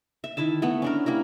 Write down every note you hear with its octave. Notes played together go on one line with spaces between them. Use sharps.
E5
D#3 E4 E5 A5
A3 B3
C#4 D4 A#4
G3 A#3 E4 A#4